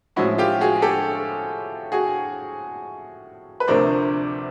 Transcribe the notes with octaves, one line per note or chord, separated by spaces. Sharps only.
A2 F3 G#3 C#4 E4 F#4
F4 G4
F#4 G#4
G4 A4
F#4 G#4
B4
D2 C3 F3 A3 D4 A#4 C5